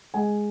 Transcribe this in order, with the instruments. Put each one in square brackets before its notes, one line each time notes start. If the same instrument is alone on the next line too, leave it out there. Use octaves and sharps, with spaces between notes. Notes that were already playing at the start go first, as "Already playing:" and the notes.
[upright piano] G#3 G#5